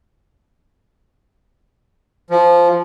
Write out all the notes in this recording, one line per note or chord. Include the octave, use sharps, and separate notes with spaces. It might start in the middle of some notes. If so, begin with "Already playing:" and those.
F3